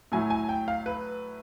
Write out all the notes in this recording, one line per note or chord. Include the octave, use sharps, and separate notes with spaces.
A2 F#3 A3 G#5
G#5
G5
F5
B4